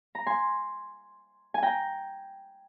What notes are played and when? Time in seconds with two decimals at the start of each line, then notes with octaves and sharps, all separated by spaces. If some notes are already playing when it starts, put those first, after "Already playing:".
0.15 A#5
0.26 G#5 C6
1.54 G#5
1.63 G5 A#5